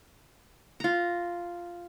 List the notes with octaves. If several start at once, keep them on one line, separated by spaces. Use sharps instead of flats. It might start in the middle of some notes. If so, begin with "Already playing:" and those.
F4 A#5